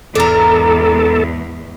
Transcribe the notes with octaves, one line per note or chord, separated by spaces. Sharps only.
E2 G#2 D4 A4 A#4